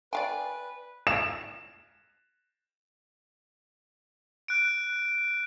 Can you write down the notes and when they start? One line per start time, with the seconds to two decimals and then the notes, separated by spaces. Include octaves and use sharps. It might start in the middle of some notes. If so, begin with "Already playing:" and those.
0.13 B4 D5 F5 G5 G#5
1.07 E7
4.48 F#6 D7